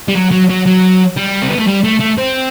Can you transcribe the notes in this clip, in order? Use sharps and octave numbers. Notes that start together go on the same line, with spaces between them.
G3
F#3
F#3
F#3
F#3
G3
C4
B3
A3
G3
A3
A3
C4